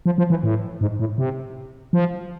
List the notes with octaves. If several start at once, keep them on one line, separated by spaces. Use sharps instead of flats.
F3
F3
E3
A2
G#2
A2
C3
F3